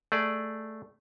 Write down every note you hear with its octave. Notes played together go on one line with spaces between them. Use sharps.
A3 G#4 D5